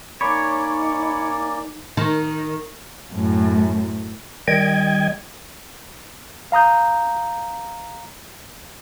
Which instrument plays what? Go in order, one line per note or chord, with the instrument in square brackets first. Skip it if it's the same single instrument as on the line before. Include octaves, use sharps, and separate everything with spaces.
[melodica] A#3 C#4 D5 [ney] D#4 [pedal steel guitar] C#5 [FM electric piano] B5 D6
[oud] D#3
[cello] F#2 A2
[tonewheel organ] D#3 G3 D#5 G5 G#6
[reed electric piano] F5 A#5 D#6 G6